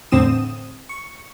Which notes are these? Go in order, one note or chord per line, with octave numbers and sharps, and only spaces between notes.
E2 A2 D3 C4 D#6 E7
C#6